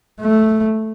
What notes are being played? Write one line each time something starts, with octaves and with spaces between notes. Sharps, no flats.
A3